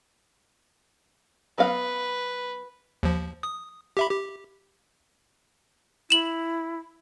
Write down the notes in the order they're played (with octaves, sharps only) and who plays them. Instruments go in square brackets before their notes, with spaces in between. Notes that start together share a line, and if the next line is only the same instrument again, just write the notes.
[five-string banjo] F#3 B3 F5 [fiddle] B4
[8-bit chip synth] D#2 F3
D#6
G4 E5 B5
G4
[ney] E4 [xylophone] E7 F#7